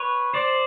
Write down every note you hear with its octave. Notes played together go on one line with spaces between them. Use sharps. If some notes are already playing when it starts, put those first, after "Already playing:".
Already playing: B4 C#5
C5 D5